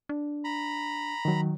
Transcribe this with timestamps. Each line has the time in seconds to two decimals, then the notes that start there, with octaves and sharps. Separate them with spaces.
0.09 D4
0.44 A#5 B5
1.25 D#3 F#3